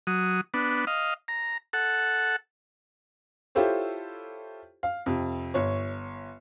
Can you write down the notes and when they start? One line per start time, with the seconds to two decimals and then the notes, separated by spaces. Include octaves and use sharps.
0.07 F#3 D#6
0.54 B3 D4
0.87 D#5 F5
1.28 A#5
1.73 A4 F#5
3.55 E4 F4 G4 A4 C5 C#5
4.83 F5
5.06 F2 C3
5.54 G1 C#5